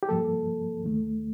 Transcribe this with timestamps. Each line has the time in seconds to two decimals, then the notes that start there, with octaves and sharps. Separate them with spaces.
0.03 G4
0.09 G2 F3 A#3 A4
0.82 D#2 D#3 A3